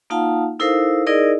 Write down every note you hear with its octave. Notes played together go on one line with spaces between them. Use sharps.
A#3 D#4 F4 F5 F#5 A5
D#4 E4 A4 A#4 C5 F5
D#4 E4 G#4 A#4 D5 D#5